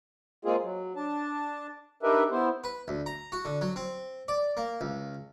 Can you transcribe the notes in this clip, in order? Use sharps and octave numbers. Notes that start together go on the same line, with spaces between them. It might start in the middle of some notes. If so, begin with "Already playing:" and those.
G#3 A#3 C4 F4 G#4
F#3
D4 A5
D4 D#4 G4 A#4 B4 E5
B3 E4 C5
B4
D2
A#5
F#4
D3
F#3
C4
D5
A#3
C#2